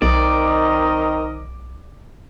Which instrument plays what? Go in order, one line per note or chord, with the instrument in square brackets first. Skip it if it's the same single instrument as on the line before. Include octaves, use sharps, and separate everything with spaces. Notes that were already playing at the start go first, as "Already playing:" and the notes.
[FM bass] B1 [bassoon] D#3 [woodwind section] C4 A#4 D#5 [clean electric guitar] D5